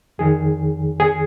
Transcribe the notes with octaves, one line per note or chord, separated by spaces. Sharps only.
F2 D#3 G#4
G#4